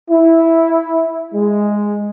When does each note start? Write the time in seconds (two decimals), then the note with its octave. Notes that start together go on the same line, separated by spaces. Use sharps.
0.11 E4
1.34 G#3